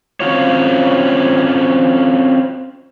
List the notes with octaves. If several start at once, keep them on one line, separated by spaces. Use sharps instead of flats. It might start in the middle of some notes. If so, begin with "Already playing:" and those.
C4 C#4 F4 F#4 C#5